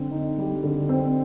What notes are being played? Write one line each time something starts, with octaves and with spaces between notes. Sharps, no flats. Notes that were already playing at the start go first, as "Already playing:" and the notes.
Already playing: D3 C4
D#4
G3
D3
C4